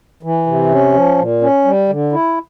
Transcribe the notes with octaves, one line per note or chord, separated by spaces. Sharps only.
E3
C3
C#4
F3
A#2
C#4
G3
D3
E4